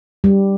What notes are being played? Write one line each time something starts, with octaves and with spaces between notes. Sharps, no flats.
G3